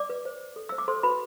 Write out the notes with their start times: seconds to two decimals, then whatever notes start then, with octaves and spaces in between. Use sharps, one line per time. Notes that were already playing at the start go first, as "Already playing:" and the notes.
Already playing: D5 D6
0.10 B4
0.25 C5
0.41 C5
0.56 A4
0.69 C5 E6
0.78 D6
0.88 A4 C5 C6
1.03 F#4 B4 B5